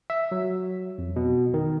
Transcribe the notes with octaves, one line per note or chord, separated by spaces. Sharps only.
E5
F#3
F2
B2
D#3